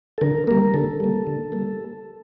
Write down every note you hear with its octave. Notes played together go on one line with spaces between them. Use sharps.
A4
D3 A#4
G3 A#3 A#4
D3 A4
G3 A#3
D3
G3 A#3